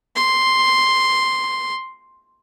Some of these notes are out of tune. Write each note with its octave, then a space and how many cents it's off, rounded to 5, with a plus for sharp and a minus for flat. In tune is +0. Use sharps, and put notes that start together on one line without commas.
C6 +0